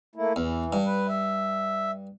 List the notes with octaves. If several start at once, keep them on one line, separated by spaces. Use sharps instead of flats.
A3 A#3 E4
E2 E3
G2
B4
E5